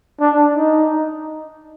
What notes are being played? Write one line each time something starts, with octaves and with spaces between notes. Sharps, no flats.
D4
D#4